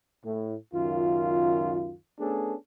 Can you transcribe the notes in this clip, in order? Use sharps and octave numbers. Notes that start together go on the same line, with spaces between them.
A2
C#2 F#2 D#3 F4
A3 B3 C#4 D4 G#4 A4